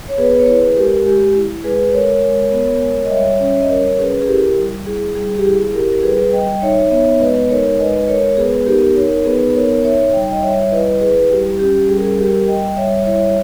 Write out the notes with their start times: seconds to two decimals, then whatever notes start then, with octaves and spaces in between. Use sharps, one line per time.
0.08 C#5
0.18 B3 G#4 B4
0.39 C#5
0.47 E4 G#4 B4
0.76 G#3 G4 A#4
1.06 G#3 G4
1.35 E4
1.64 G#3 G#4 B4
1.93 G#3 A#4 C#5
2.23 G#3
2.52 B3
2.81 G#3
3.05 D#5
3.10 G3 C#5 E5
3.40 C#4 C#5 E5
3.61 D#5
3.69 G3 A#4 C#5
3.99 C#4 G#4 B4
4.22 G#4
4.28 E4 G4 A#4
4.57 G3
4.86 E4 G#4
5.15 G3 G#4
5.38 G4
5.45 E4 G#4
5.73 E4 G4 A#4
6.03 G3 G#4 B4
6.33 G3 D#5 G5
6.62 D#4 C#5 E5
6.91 B3 C#5 E5
7.20 G#3 B4 D#5
7.49 D#4 A#4 C#5
7.79 G#3 B4 D#5
8.08 G#3 A#4 C#5
8.37 B3 G#4 B4
8.66 D#4 G4 A#4
8.96 D#4 A#4 C#5
9.25 B3 G#4 B4
9.54 D#4 A#4 C#5
9.84 D#4 C#5 E5
10.13 G3 G5
10.31 D#5 G5
10.42 G3 C#5 E5
10.61 E5
10.72 E4 B4 D#5
11.01 E4 G#4 B4
11.31 G3 G4
11.59 C#4 G4
11.89 G3 G#4
11.97 A#4
12.05 G#4
12.18 G3 G4 A#4
12.47 G3 D#5 G5
12.77 G3 C#5 E5
13.05 E4 C#5 E5